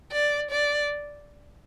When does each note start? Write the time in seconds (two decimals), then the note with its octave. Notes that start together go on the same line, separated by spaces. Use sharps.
0.12 D5
0.51 D5